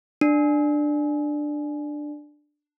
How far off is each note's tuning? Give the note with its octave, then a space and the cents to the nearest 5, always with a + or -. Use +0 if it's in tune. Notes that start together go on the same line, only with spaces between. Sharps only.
D4 +10